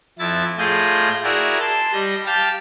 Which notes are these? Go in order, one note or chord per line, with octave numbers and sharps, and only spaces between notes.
F2 E4 A6
A2 F4 G#4 D#5 G6
E4 F#4 G#4 A#4 D5
A5 C6
G3 D#5
G4 F5 G5 A5